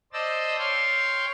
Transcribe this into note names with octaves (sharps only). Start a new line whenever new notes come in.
C5 D5 D#5 A5 E6
C#5 F5 G5 C6